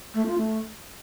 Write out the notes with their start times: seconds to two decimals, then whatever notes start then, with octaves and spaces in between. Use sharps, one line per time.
0.14 A3
0.26 F4
0.38 A3